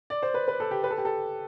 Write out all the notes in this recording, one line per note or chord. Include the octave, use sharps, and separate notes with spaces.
D5
C5
B4
B4
A4
G4
B4
A4
G4
A4